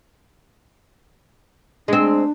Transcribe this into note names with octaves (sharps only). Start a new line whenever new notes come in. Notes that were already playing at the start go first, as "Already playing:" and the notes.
G#3 C4 D4